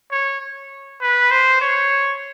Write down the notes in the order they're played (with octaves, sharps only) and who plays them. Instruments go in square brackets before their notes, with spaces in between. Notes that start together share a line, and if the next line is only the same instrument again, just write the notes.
[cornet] C#5
B4
C5
C#5